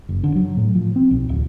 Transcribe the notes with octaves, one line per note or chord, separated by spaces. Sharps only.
F#1
D3
F#3
A2
F3
C4
B1
D1